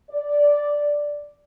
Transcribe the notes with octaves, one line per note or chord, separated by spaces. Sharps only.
D5